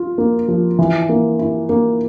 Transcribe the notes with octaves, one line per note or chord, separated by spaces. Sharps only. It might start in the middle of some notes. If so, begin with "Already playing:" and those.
Already playing: F4
A#3
F3
E3
A#3
E4
A#3